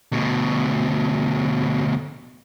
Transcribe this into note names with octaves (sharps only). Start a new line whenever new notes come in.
D2 B2